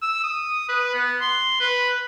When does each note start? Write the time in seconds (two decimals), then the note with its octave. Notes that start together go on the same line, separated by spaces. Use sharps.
0.02 E6
0.24 D#6
0.69 B4
0.94 B3
1.21 C6
1.60 B4